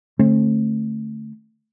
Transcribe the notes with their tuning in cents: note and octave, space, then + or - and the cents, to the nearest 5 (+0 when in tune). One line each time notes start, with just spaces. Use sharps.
D3 +10 A3 +0 C4 +40